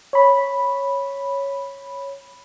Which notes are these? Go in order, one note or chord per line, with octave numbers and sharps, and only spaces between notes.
C#5 B5